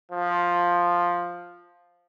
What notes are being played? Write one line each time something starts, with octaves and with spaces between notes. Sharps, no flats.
F3